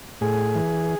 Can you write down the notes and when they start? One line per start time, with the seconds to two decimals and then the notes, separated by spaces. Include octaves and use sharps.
0.21 A2 G#4
0.55 E3